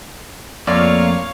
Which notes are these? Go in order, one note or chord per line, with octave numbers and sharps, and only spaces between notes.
F2 A3 A#3 F4 C#5 D5 F5